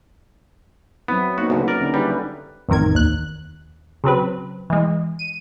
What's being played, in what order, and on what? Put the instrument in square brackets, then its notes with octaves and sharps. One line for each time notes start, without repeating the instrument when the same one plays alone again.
[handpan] F#3 C4 E4 [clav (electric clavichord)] B3
[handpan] A#3 B3 D#4 [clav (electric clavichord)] F#4
[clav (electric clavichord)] D2 G#2 [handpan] C#3 A#3 B3
[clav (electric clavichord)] A#4 D5
[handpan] D3 C#4 D#4
[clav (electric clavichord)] G3 [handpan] E4 B4
[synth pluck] A1 F2 D#3 A#4 G#6
D#2 F#6
C#3 F#3 C4 B4
E3 G#3
D#7